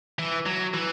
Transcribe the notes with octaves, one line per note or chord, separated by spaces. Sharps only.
E3
F#3
E3